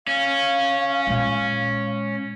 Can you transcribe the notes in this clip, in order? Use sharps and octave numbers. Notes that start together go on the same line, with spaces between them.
C#4 F5
A#2 G#3